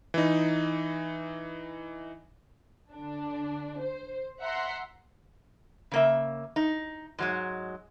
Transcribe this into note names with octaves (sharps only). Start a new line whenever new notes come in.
E3 D#4
D3 D4
C5
E5 F#5 A#5 C6
C#3 A#3 E5
D#4
G#2 F#3 G#3